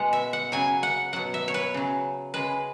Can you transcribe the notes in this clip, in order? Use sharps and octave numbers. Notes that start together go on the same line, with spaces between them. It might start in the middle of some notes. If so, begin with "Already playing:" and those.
Already playing: B2 G#3 F#5
E5
F#5
C#3 F#3 G#5
F#5
B2 F#3 F#5
E5
C#5
B4
C#3 F#3
C#3 G#3 B4